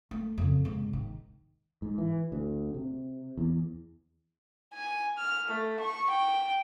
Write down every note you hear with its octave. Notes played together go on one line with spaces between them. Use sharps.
A3
F2 C#3
G#2 C3
D#3
G#2
E3
D2
C3
E2
G#5
F6
A3
C#6
G5